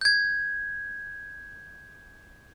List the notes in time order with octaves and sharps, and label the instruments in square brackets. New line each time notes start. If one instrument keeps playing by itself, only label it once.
[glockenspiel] G6 G#6